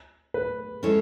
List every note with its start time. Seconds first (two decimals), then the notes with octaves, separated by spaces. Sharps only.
0.34 B4
0.83 G#3 C#4 E4 A4 C#5